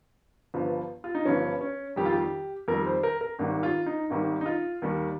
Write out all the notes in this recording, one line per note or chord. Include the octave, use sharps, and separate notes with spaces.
G1 G2 F3
F4
D#4
G1 G2 F3 C#4
C#4
F2 D#3 G3 G4
F4
G4
F2 D#3 G3 A#4
C5
A#4
A#4
G#1 G#2 D#3 G3
F4
D#4
G#1 G#2 D#3 G3
D#4
F4
D#2 D#3 G3